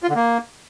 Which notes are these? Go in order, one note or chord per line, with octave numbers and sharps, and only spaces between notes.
F4
D3
A#3